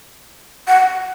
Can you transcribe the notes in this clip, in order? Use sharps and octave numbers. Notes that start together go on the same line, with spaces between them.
F#5